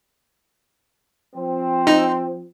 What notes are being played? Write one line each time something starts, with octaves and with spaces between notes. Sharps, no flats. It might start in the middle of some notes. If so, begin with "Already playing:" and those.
F3 C4
D#4